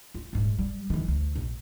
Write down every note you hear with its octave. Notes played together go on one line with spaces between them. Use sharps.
F4
D#1 G#2
G3
D#3 E3
D2
A#1